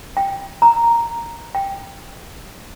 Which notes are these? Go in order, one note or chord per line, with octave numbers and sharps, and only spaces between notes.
G5
A#5
G5